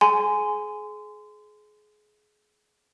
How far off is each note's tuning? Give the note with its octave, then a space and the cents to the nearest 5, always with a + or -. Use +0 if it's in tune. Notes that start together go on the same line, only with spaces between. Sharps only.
G#4 +30 G#5 +0 C6 -30